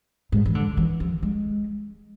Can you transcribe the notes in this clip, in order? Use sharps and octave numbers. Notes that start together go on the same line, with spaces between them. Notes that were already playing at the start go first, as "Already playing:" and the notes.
G#2
E3
D3
E3
F3
G#3